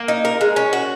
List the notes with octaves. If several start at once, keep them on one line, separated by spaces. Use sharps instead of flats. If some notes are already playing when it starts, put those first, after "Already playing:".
Already playing: A#3
D#4
A#4
G#3
C#4
F#4